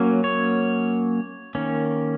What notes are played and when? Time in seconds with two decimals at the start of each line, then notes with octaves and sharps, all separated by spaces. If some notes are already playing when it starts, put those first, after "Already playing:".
Already playing: F#3 A#3 C#4
0.24 C#5
1.55 D#3 A#3 C#4